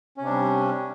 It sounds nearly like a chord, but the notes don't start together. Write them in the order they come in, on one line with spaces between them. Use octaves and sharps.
C#4 C3 D4 G3